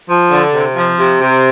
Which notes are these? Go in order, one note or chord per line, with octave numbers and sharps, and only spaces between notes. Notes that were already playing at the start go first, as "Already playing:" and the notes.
F3
D3
C3
F3
C3
C3